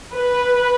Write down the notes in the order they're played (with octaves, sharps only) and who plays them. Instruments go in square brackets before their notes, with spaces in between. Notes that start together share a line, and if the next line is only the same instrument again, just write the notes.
[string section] B4